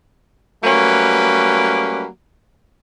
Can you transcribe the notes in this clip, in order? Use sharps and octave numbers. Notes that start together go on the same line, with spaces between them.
F#3 G3 A3 A#3 C#4 B4